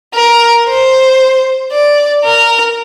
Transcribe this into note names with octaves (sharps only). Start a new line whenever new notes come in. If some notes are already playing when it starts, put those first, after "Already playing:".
A#4
C5
D5
A#4